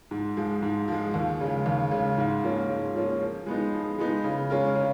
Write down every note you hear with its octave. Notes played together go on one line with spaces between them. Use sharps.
G#2
F3 G#3
G#2
F3 G#3
D#2
C#3 G#3
D#2
C#3 G#3
G#2
F3 A#3 C#4 F4
G#2
F3 A#3 C#4 F4
F3
G#3 B3 D#4
F3
G#3 B3 D#4
C#3
G#3 C#4 F4 A#4
C#3